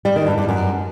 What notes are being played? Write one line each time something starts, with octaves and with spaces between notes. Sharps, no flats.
G3
D#3
G2
G2
F#2